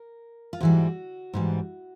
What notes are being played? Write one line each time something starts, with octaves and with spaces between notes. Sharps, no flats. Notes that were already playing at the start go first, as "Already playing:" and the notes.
Already playing: A#4
F4
G#2 E3 G3 F#4
G#2 E3 G3